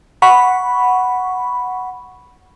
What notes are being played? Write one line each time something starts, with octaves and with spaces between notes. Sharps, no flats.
F#5 B5 C#6